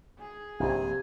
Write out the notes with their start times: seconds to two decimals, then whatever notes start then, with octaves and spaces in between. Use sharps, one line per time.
0.19 G#4
0.60 A#1 G2 C3 G#5